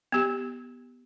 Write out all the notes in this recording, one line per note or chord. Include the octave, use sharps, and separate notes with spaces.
B3 G4